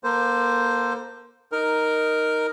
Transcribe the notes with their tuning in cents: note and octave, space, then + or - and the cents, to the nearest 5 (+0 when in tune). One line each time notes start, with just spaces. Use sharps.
A#3 +30 A4 +35 C5 -5
D#4 +0 A#4 +0